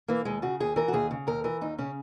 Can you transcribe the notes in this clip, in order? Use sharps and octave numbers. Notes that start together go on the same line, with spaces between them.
E3 A#3
D#2 G#3
C#3 F#4
D#2 G#4
E3 A#4
F#4
D#2 G#4
C#3
D#2 A#4
E3 A#4
D#2 D#4
C#3 C#4